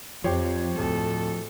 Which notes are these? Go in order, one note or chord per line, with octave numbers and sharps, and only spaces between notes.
F2 F3 G4 C5 C#5
D1 A4